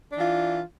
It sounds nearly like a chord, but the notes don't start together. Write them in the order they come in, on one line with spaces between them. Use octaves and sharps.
D4 E3 F4